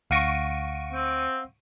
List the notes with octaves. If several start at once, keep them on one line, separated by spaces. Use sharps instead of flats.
D2 F5 F#5 C#6 A#6 D7 D#7
C4